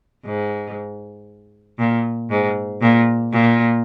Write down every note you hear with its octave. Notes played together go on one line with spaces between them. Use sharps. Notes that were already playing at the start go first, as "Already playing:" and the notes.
G#2
A#2
G#2
A#2
A#2